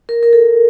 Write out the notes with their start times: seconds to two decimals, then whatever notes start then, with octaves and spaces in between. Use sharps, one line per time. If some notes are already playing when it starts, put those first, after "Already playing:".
0.09 A#4
0.23 A#4
0.33 A4